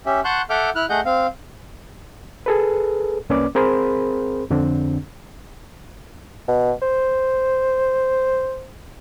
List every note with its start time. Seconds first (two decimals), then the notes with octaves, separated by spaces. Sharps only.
0.06 C#4 G4 E5
0.25 F#5 A5 C6 C#6 F#6 G6
0.50 A4 E5 F#5 D6 F6 G6
0.75 E4 F6 F#6
0.90 A3 G#4 D#5 F#5 G6
1.05 C4 F5
2.46 G#4 A4 B4
3.30 C2 A#3 C#4 B4 D5 D6
3.55 C4 G#4 A#4 C5 B5 C6
4.50 F2 D3 C4 D4
6.48 B2
6.82 C5